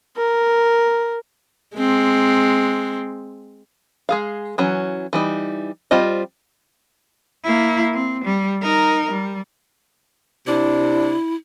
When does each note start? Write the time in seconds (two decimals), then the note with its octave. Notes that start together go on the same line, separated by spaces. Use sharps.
0.17 A#4
1.76 G#3 C4
4.09 G#3 G#4 F5
4.58 E3 F#3 C#4
5.13 E3 G3 D#4
5.91 G3 C4 F4 C5 D#5
7.44 A#3 E4
7.92 C4
8.24 G3
8.62 D#4 A#4
9.11 G3
10.47 C3 D4 E4